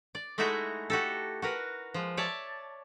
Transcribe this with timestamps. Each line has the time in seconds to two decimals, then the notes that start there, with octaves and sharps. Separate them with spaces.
0.15 D5
0.38 G#3 A3 D#4 E4 F#4 E5
0.90 F#4 G4 A4
1.42 F#4 A#4 B4
1.94 F3 G#3
2.17 C#5 D5 E5 A5